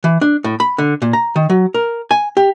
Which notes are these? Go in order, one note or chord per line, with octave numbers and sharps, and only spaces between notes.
E3
D4
A2
B5
D3
A#2
A#5
D#3
F#3
A#4
G#5
G4